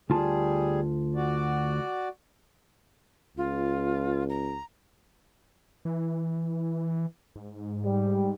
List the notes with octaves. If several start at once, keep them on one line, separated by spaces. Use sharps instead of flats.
D2 G3 F4 G#4 A5
F#4 D5
C#2 F4
A#5
E3
G#2
G3